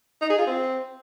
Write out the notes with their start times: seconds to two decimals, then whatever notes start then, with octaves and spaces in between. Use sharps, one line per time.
0.22 D#4
0.30 G#4
0.39 F4
0.47 C4